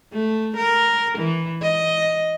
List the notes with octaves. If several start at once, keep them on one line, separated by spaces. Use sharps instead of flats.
A3
A#4
E3
D#5